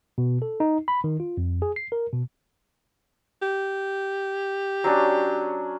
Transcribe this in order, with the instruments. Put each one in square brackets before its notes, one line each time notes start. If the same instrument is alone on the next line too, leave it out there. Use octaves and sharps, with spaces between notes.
[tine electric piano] B2
A4
D#4
B5
D#3
F4
F2
G#4
C7
A#4
B2
[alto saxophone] G4
[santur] F#3 C#4 D4